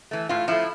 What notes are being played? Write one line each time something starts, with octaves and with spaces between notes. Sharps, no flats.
E3 A3
A2 F4
F3 A3 E4